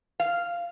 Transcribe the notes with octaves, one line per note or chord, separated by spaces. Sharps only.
F5